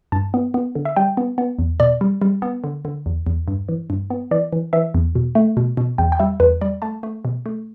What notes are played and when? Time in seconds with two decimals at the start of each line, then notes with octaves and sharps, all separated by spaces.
0.12 G2 A5
0.34 B3
0.54 B3
0.75 D3
0.85 E5
0.96 G3 G5
1.17 B3
1.38 B3
1.59 E2
1.80 B2 D5
2.01 G3
2.22 G3
2.42 B3
2.64 D3
2.85 D3
3.06 E2
3.27 E2
3.48 G2
3.69 E3
3.90 G2
4.10 B3
4.31 E3 D5
4.53 E3
4.73 E3 E5
4.95 E2
5.15 B2
5.35 A3
5.57 B2
5.77 B2
5.98 E2 G5
6.12 G5
6.20 G3 E5
6.40 E2 B4
6.61 G3 D5
6.82 A3 A5
7.03 A3
7.25 B2
7.46 A3